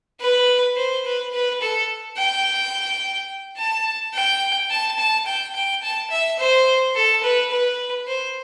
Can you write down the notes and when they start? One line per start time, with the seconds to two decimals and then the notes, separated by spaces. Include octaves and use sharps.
0.21 B4
0.77 C5
1.05 B4
1.33 B4
1.61 A4
2.17 G5
3.58 A5
4.14 G5
4.71 A5
4.98 A5
5.26 G5
5.54 G5
5.83 A5
6.11 E5
6.39 C5
6.95 A4
7.23 B4
7.51 B4
8.08 C5